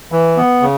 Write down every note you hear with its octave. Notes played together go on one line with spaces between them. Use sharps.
E3
B3
C#3